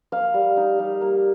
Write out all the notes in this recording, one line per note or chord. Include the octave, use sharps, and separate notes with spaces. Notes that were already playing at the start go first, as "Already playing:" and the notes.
A#3 F5
G3
D#4
G3
A#3